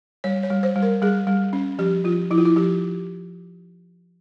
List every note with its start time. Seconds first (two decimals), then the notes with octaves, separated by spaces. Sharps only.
0.24 G3 C#5
0.43 C#5
0.50 G3
0.63 C5
0.76 G3
0.82 A#4
1.02 G3 G#4
1.27 G3
1.53 C#4
1.79 F3 G4
2.05 F3 F4
2.31 F3 E4
2.38 F4
2.45 E4
2.56 F3 G4